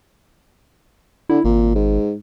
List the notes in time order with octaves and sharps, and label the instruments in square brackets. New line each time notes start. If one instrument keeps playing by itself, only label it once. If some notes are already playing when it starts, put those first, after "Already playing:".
[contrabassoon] D3 [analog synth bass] E4
[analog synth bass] G#1 [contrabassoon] A#2
[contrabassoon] G#2